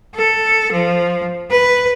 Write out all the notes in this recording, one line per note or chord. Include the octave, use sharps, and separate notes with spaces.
A4
F3
B4